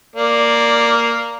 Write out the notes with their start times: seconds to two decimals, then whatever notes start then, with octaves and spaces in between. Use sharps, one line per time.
0.16 A#3 D5